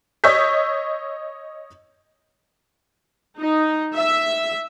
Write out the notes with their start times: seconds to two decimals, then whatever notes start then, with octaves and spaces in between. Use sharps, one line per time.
0.24 C#5 D#5 C#6 E6 G6 B6
3.39 D#4
3.95 E5